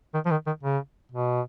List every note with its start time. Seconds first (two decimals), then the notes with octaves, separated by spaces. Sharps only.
0.14 D#3
0.25 F3
0.31 D#3
0.46 D#3
0.63 C#3
1.12 B2